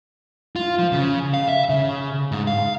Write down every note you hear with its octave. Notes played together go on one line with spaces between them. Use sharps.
F4
F3
C#3
F5
E5
C#3
G#2
F5